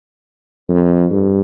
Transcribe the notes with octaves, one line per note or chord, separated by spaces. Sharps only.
F2
G2